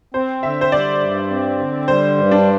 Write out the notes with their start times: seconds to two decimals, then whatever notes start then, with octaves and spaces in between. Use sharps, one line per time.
0.14 C4 C5
0.43 D3 E5
0.61 C5
0.72 G3 D5
1.01 G2
1.30 C4
1.59 D3
1.88 G3 C5
2.17 G2
2.31 D4